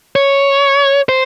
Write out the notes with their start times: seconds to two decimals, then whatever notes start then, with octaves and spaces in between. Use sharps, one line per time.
0.16 C#5
1.09 C5